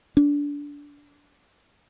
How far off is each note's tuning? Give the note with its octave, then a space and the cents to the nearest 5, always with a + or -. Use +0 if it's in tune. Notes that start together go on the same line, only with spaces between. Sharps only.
D4 -20